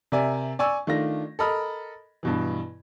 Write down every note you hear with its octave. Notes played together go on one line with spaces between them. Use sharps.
C3 A#4 D5 E5 G#5
D5 G#5 C#6 E6
D#3 A3 D4 F4 A#6
A4 A#4 D#5 B5 F6
G2 B2 E3